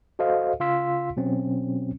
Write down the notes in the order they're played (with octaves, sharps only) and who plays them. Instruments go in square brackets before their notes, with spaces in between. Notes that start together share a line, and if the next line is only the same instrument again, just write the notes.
[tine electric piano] F#4 A4 C5 D#5 F5
C#3 F4 F5 C6 E6 B6
B2 F#3 C4 C#4